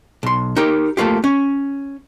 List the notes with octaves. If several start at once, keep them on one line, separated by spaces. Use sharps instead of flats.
B1 C6
D#4 G4 A#4
A3 A#3 F4 G4
C#4